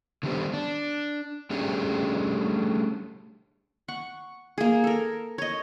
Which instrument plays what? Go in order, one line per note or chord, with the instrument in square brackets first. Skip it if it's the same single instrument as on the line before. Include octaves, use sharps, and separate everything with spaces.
[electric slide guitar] D3 D#3 G3 B3 G4 C5
D4
G3 A3 C#4 D4 G4 G#4
[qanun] F#5 C#6
A#3 G#4
A4 A#4
C#5 D#5